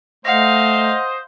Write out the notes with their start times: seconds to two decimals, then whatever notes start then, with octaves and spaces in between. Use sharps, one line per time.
0.25 A3 C5 D#5 F5 F#5 A#6